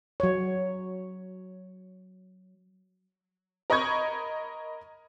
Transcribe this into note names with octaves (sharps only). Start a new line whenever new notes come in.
F#3 C#5
A#4 D#5 B5 C#6 G#6